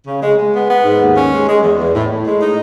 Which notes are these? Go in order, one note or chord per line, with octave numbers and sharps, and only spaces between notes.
C#3
G#3
G#3
B3
B3
G#2
D#2
C#4
G#3
G#3
E2
E2
A2
A2
G#3
D#4